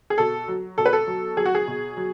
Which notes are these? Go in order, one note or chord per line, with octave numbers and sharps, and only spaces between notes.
G#4
B2 A4
F#3
B2 A4
B4
A4
F#3
F#3 G#4
F#4
G#4
B2
F#3